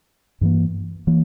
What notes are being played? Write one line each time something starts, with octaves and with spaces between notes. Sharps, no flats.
G2 E3 A#3
E3 A#3